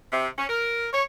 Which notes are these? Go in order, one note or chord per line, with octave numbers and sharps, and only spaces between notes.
C3
C#4
A#4
C#5